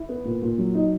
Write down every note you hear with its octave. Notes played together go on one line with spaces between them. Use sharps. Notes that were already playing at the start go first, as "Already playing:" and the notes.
Already playing: E4
B3
A#2
A#2
F#3
D#4